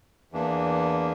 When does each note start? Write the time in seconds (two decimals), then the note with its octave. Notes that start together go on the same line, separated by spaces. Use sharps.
0.32 E2 E3 A#3 D4